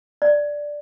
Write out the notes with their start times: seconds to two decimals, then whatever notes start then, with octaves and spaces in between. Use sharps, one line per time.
0.22 D5